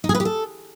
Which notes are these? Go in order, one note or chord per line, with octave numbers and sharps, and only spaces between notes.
D#4
G#4
B4
G4
A4